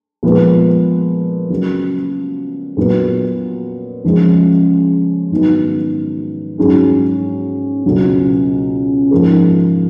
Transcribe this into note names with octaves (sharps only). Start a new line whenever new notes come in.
A#2 F3 G#3 B3
C#3 F#3 A#3
A#2 F#3 B3
C#3 F3 G#3 C#4
G#2 D#3 F#3 B3 D#4
G#2 F#3 C#4 G#4
C#2 B2 F#3 C#4
G#2 F3 A#3